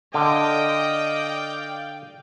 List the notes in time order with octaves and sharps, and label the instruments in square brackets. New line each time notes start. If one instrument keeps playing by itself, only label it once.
[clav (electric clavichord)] D3 [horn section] D5 F5 G5 [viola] D#5